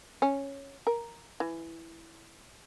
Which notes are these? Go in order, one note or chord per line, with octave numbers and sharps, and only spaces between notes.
C#4
A#4
E3